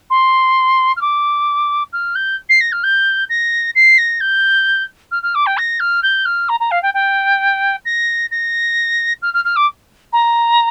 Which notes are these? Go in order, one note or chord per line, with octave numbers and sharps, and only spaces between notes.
C6
F6
D6
F6
G6
C7
A#6
F6
G6
A#6
C7
A#6
G6
F6
F6
D6
G5
A#6
F6
G6
F6
A#5
A#5
F5
G5
G5
A#6
A#6
F6
F6
F6
D6
A#5